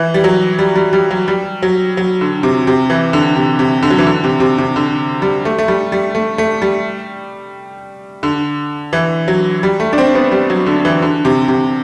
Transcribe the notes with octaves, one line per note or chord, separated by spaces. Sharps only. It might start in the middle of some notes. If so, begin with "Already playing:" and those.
Already playing: E3
G3
F#3
G3
G3
G3
F#3
G3
F#3
F#3
D3
C3
C3
E3
D3
C3
C3
D3
F#3
E3
D3
C3
C3
C3
D3
G3
A3
A3
G3
G3
A3
A3
G3
D3
E3
F#3
G3
A3
D4
C4
B3
G3
F#3
D3
E3
D3
C3
C3